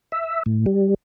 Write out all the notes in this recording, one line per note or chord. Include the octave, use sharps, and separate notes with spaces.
E5
A2
G3